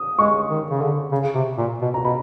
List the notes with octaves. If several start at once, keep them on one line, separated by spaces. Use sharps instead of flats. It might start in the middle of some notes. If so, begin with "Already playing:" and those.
Already playing: D#6
G#3 C#6
D#3
C#3
D3
C#3
C3
A#2
B2
A#5
B2 B5